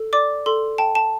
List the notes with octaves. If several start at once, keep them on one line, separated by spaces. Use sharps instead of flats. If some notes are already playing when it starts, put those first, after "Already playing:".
Already playing: A4
D5 D6
A4 C6
G5 A5
A5